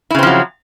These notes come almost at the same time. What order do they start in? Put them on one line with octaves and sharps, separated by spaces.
E4 C#3 C4 F3 F#3